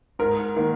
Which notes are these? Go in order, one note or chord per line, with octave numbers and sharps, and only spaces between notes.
G#2 A#4
D#3 A#3